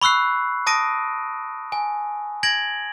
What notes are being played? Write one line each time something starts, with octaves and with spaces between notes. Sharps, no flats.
B5 C#6 E6 F#6 C7
A5 D#6 A#6 D7 D#7
G#5
G#6 A#6 D7 F#7